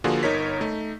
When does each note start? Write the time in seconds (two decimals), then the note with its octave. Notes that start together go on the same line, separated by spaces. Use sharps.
0.04 D3 F3 A#3 F4 F#4 G#4
0.23 G1 D#4 A#4 C#5 B6
0.61 A3 D#4